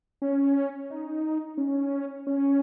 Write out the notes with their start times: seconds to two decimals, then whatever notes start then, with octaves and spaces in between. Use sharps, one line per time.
0.22 C#4
0.90 D#4
1.58 C#4
2.27 C#4